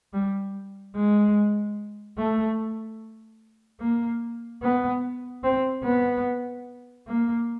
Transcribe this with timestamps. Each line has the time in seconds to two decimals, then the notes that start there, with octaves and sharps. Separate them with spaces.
0.13 G3
0.96 G#3
2.18 A3
3.80 A#3
4.63 B3
5.44 C4
5.84 B3
7.08 A#3